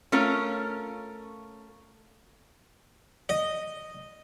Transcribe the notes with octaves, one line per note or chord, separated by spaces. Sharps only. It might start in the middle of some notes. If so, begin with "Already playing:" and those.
A3 C#4 F4 A#4
D#5